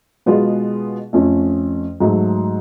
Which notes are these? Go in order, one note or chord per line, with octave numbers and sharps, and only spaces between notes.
B2 G#3 B3 F4 G#4
F2 F3 A3 C#4
G#2 F#3 A3